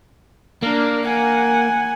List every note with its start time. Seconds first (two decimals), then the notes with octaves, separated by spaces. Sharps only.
0.63 A#3 D4 A#4
1.05 F#5 G#5